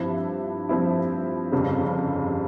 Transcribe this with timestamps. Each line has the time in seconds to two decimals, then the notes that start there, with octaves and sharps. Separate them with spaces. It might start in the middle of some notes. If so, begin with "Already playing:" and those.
Already playing: G2 F3 C4 E4
0.69 G2 F3 C4 E4
1.52 G1 F2 C#3 G3